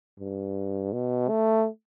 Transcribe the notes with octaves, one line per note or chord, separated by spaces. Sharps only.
G2
B2
A3